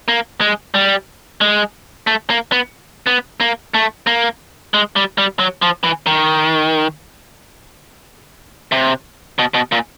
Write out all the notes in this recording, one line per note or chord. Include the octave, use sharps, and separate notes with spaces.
A#3
G#3
G3
G#3
A3
A#3
B3
B3
A#3
A3
A#3
G#3
G3
G3
F#3
F3
E3
D#3
C3
B2
B2
A#2